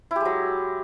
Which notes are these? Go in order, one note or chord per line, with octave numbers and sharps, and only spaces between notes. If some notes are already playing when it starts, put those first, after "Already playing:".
F#3 G#3 E4 G4